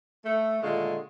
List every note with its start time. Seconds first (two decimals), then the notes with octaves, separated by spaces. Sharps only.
0.24 A3
0.62 A#2 D3 D#3 G#3 A3 F4